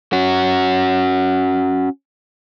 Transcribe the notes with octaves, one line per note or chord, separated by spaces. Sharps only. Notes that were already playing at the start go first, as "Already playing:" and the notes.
C#4 F#4